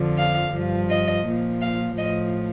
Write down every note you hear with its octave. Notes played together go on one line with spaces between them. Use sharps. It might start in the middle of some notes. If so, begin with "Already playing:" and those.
Already playing: F2 D3 F3
F5
G2 F3
D#5
A#2 F3
F5
A2 F3 D#5